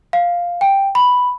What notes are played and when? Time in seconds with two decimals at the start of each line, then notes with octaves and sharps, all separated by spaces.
0.13 F5
0.61 G5
0.95 B5